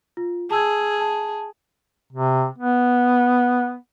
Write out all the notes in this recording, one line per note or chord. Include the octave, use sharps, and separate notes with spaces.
F4
G#4 A5 E6 G#6
A5
C3
B3